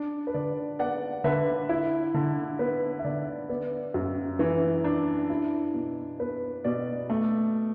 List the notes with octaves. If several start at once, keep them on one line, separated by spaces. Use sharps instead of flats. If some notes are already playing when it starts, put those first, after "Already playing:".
Already playing: D4
B4
D3 D5
B3 D5 F#5
D3 B4 E5
E4
D3
B3 B4
E5
D3 D5
B3 D5
F#2
E3
D4
E4
B2
B3 B4
B2 D5
A3